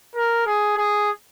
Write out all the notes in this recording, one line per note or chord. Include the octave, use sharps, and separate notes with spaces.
A#4
G#4
G#4